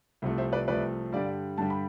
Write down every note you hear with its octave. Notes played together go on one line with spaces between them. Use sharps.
C2 C3 F3 A3
C5 E5
B4 D5
C2 C3 F3 A3 B4 D5
G2 D3 G3 D5 F5
G2 D3 G3 A5
B5